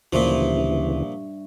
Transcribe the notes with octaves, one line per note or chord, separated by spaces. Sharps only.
D2 G2 A#2 C#3 E3 F3 E5 C#6